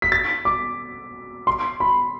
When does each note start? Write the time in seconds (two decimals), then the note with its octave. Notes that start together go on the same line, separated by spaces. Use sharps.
0.02 B6
0.12 A6
0.45 D6
1.47 C6
1.80 B5